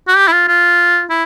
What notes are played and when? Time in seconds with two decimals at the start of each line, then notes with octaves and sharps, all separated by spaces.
0.08 F#4
0.17 G4
0.28 E4
0.32 F4
0.48 F4
1.10 E4